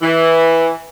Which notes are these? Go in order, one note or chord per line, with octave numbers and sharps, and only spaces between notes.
E3